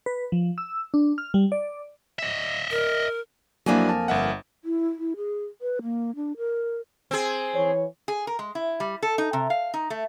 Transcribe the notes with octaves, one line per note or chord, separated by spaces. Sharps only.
B4
F3
E6
D4
F6
G3
D5
D#5 E5
A#4
F2 F#3 A#3 D4 E4 G#5
A5
G1 E5 F#5
E4
E4
G#4
B4
A#3
D4
A#4
C4 G#4
E3 C#5
G#4
A#4
G#3
E4
G3
A4
D#4
C3
F5
D#4
A3